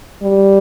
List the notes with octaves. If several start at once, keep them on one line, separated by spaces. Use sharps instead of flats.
G3